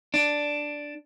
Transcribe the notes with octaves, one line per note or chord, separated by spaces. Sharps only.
D4